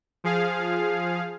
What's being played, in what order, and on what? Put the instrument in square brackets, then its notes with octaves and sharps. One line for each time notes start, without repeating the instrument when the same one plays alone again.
[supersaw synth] F3 G#4 F5